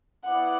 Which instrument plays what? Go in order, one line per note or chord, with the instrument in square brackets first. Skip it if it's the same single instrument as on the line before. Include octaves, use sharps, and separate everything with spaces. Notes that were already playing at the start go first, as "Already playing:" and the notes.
[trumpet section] B3 E4 D5 [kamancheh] F#5